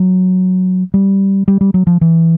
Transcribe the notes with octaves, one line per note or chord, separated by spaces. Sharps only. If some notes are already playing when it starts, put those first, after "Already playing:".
Already playing: F#3
G3
G3
G3
F#3
F3
E3